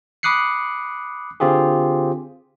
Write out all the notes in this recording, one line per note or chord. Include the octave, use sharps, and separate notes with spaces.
B5 D6 D#6 F#6 C7 C#7
D3 C4 F4 G4 G#4